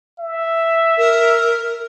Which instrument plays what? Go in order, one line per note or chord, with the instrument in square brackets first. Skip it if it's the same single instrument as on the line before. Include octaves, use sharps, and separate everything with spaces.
[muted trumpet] E5
[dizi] A#4